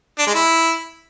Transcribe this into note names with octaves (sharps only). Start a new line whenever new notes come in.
D4
G#3
E4